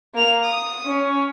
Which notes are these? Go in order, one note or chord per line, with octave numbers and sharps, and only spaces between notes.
A#3 F7
D#6
C#4